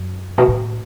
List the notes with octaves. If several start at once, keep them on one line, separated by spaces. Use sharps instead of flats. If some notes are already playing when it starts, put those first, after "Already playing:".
Already playing: F#2
B2
A2